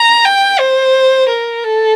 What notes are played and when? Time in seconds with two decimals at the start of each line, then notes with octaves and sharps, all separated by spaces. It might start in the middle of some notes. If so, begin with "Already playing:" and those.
Already playing: A#5
0.25 G5
0.59 C5
1.29 A#4
1.64 A4